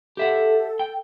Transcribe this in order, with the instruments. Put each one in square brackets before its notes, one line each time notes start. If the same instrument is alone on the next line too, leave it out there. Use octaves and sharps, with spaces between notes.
[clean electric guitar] G4 E5 F#5 [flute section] A4
[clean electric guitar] G5